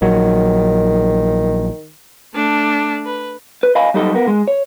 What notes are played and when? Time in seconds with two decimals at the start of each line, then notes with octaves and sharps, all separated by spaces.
0.02 A#1 D#3 F#3
2.35 A3 D4
3.06 B4
3.63 B4
3.75 D#5 F5 G#5 B5
3.94 F#3 G3 D#4 G4 A4 D#5
4.14 B3 A#4
4.27 G#3
4.48 C#5